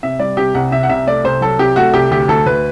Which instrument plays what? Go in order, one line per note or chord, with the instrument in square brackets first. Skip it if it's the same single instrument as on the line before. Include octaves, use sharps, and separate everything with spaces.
[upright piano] C3 E5
G3 D5
C3 G4
C2 F#5
C3 E5
F#5
C2 E5
A3 D5
C2 C5
F#3 A4
C3 G4
A3 F#4
C2 G4
D2 G4
D2 A4
D2 B4